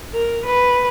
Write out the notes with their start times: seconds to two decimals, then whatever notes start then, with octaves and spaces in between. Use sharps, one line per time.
0.14 A#4
0.46 B4